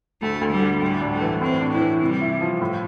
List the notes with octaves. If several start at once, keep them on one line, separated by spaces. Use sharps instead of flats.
D2 A3
D2
G3
D3
A2 G3
D4
A3
E3
A2 C4
D4
E4
E3
C3 G3
E4
F3
A2